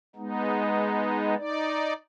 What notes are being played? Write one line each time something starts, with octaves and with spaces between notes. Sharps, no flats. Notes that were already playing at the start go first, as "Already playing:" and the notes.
G#3 B3 D#4
D#4 D5